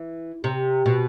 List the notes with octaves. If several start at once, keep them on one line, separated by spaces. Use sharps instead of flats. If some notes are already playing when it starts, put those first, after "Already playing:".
Already playing: E3
C3
B2